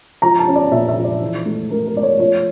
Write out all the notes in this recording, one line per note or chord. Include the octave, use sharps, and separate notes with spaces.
F3 A#5
A5
C#4
D5
A#2 E5
E5
F3
D5
E3
A3
A3 A#4
A#4
A3 D5
C#5
F3 C#5